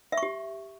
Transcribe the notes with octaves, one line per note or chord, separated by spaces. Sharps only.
E5
C#6
G4